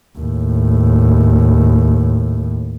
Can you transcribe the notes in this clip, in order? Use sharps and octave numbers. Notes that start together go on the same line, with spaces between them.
D#2 A2